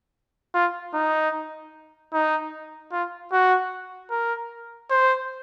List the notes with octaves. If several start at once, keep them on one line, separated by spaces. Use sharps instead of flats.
F4
D#4
D#4
F4
F#4
A#4
C5